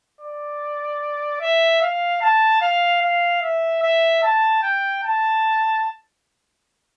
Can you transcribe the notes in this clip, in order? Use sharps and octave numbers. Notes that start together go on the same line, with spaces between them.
D5
E5
F5
A5
F5
F5
E5
E5
A5
G5
A5